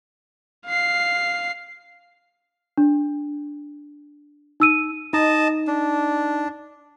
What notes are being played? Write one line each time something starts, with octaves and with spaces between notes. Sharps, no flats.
F5 C7
D4
D#4 E6 D#7
D#4 D#5 A5
D4